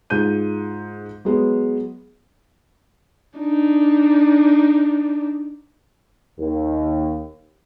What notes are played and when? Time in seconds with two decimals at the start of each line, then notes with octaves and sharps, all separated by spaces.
0.10 G#2 F4 G6 D#7
1.25 F#3 G#3 B3
3.39 D4 D#4
6.39 D#2